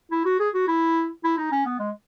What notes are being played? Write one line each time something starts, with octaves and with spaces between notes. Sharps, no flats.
E4
F#4
G#4
F#4
E4
E4
D#4
C#4
B3
G#3